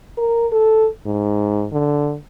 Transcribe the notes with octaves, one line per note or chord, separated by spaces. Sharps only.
A#4
A4
G#2
D3